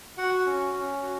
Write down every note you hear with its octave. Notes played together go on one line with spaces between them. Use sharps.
F#4 F#5
C#4
C#4
F#4